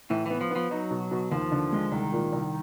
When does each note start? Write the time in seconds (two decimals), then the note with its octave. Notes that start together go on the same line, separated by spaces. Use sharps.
0.10 A2 E3
0.26 E3 B3
0.41 F3
0.51 F3 B3
0.71 F#3 D#4
0.90 B2
1.11 B2
1.32 D#2 F3
1.52 D3
1.72 G#3
1.92 C2 D#3
2.13 A#2
2.32 C2